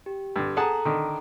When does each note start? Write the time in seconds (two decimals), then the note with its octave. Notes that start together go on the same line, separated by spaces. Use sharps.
0.06 G4
0.36 G2 D3
0.57 G#4 A4 F#5 A5 A#5
0.85 D3 D#3